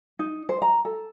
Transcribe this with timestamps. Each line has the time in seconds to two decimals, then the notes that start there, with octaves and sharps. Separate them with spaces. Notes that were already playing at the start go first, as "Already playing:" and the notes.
0.19 D#4
0.49 C5
0.62 A#5
0.85 A4